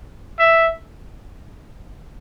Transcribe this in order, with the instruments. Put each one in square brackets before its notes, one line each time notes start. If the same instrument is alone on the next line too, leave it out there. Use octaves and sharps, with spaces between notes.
[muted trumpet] E5